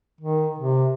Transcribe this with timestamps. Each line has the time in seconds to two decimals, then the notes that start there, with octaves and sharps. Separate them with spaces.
0.21 D#3
0.58 C3